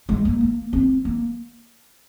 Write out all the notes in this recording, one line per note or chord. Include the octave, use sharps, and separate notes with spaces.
G#3
A#3
A#3
C4
A#3